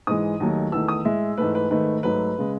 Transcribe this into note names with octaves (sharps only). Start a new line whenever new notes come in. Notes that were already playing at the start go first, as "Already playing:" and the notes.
G#2 E3 G#3 D#6
D#2 D#3 F#3 A3
E2 D#3 A3 E6
D#6
A2 G#3 E5
G#2 E3 A3 B4
B4
G#2 D#3 A3 B4
G#2 F#3 A3 B4
C#3 G#3